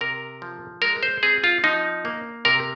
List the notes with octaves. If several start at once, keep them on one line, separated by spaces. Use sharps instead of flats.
C3 A#4
F3
G#3 A#4
C5
C4 G#4
F4
F3 D#4
A#3
C3 A#4